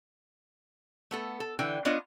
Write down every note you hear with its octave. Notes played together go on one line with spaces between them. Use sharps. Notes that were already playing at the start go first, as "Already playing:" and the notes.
A3 B3 A4
A4
D3 E3 G5
B3 D4 F4 C#5 D#5